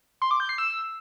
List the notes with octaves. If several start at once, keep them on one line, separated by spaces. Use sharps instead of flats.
C6
D6
G6
C7
E6